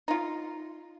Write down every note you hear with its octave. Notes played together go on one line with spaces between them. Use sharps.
D#4 F4